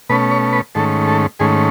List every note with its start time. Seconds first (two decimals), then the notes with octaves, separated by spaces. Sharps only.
0.09 B2 A3 C#4 B4
0.31 C#5
0.53 B4
0.75 G#2 D#3 A3 C#4 A4
1.08 A4
1.39 G#2 D#3 A3 C#4 G#4